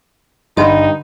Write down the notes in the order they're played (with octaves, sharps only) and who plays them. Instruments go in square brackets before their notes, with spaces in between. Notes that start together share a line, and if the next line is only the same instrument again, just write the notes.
[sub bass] G#1 [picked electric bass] G2 [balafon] D3 F#5 C6 [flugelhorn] D#4